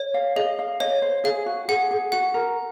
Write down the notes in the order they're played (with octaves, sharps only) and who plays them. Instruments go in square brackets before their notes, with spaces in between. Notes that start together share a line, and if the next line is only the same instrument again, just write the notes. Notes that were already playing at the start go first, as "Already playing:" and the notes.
Already playing: [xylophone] C#5
[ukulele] F5
[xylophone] G#4 [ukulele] D#5
[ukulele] F5
[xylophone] C#5 [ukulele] D#5
[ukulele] C5
[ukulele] G#4 [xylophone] F5
[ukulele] F#4
[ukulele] G#4 [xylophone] F#5
[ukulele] G#4
[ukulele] F#4 [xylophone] F#5
[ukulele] A#4